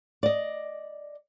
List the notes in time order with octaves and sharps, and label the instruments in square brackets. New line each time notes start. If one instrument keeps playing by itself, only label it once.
[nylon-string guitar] D5 D#5